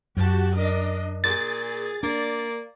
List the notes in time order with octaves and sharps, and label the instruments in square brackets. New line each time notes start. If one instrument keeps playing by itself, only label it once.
[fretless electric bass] F#2 [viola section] F#4 G4 A5
[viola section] D4 A#4 D#5
[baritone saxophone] A#2 [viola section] G#4 [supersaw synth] A6
[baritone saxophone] A#3 [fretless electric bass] D4 [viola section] D5